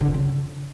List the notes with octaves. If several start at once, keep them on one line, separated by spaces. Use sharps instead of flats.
D3
F2
C#3